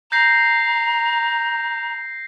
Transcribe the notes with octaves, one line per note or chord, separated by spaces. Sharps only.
A#5 G6 A#6 C7